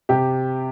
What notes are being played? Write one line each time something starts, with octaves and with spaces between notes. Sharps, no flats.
C3 G4